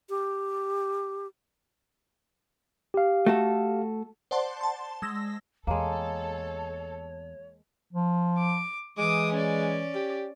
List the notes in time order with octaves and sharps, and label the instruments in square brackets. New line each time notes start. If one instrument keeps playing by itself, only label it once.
[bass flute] G4
[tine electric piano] G4 F5
[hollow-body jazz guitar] A3 F#4 A4
[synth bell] C5 D5 F#5 A5 C6
A5 C6
G#3 E6 A#6
[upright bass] E2 [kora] G#3 A#3 [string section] A4 [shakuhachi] C#5
[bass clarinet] F3
[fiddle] D6
[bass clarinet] E3 [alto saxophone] G#3 [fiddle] D6 D#6
[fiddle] C#4 D5
[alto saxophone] G4